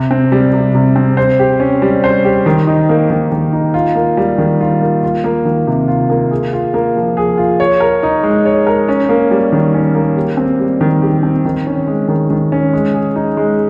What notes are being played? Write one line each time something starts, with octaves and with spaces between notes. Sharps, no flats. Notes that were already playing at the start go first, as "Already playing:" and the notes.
Already playing: C3
C4
G3
C3
C3
C4
C5
G4
C#4
G3
C5
G4
D#3
D#4
A#3
D#3
D#3
D#4
F4
A#3
G3
D#3
F4
A#3
F4
A#3
D#3
C3
F4
A#3
G#4
F4
A#3
F3
G#4
F4
C#5
A#4
D#4
G#3
C#5
A#4
C#4
A#3
G3
D#3
C#4
A#3
G4
C4
G3
D#3
G4
C4
D#3
C#4
G#3
D#3
D#3
C#4
G#3
G#4
D#4
G#3